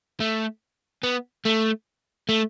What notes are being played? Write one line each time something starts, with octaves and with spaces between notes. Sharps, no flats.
A3
B3
A3
A3